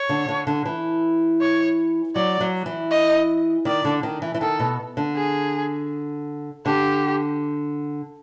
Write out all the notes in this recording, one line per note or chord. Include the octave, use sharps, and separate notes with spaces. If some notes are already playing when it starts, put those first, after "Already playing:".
Already playing: C#5
D3
D3
D3
E3
C#5
F#3 D5
F#3
E3
D#5
D#3 D5
D3
D#3
E3
E3
D#3 A4
B2
D3
G#4
D3 G4